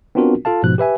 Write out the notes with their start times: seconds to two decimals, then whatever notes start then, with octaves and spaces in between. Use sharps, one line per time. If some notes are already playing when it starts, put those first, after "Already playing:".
0.15 B3 C4 D4 F4 F#4 A#4
0.45 F4 A4 F5 A5
0.63 G#2 B2 F3 F#6
0.78 G4 B4 E5 G#5